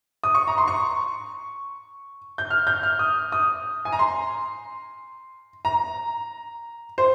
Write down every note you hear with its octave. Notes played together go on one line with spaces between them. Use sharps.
D#6
C#6
A#5
C6
C#6
G6
F6
G6
F6
D#6
D#6
G#5
A#5
C6
A#5
C5